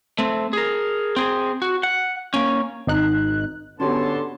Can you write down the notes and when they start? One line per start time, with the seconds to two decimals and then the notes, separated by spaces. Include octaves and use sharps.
0.19 A3 C4
0.53 G#4 A#4
1.16 C4 G#4
1.62 F#4
1.83 F#5
2.34 A#3 C#4
2.87 G#1 D#4 F#6
3.80 D3 B3 C#4 F#4 G4 C#5 A5 C6